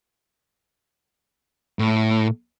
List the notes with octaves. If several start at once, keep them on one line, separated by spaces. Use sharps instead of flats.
A2